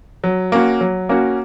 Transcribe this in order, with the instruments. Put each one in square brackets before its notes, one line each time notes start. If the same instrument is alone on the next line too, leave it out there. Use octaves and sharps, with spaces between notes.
[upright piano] F#3
A#3 C#4 F#4
F#3
A#3 C#4 F#4